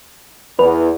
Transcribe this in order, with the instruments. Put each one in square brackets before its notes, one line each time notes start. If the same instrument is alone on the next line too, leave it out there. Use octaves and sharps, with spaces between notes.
[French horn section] E2 [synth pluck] B4